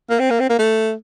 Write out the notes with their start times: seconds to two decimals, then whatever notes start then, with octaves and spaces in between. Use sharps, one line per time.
0.10 A#3
0.20 C4
0.30 A#3
0.40 C4
0.50 A#3
0.59 A3